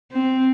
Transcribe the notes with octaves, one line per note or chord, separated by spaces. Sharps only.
C4